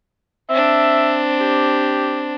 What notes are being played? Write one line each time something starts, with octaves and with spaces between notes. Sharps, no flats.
C4 D4 E5
G4